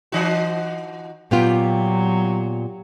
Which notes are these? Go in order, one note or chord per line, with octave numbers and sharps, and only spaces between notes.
E3 D#4 F#4
A#2 F#3 B3 F4 G4